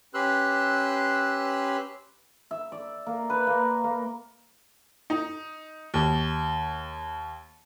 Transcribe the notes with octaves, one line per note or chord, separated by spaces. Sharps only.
C#4 G4 B4 C6 E6 F#6
E5
D5
A#3
B4
A#3
A#3
D#4
D#2